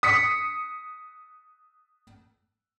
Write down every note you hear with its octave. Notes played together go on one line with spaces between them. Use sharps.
D#6 B6 C#7